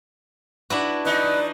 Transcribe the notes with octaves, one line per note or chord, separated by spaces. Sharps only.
D4 E4 F#4 B4
E3 D#4 B4 D5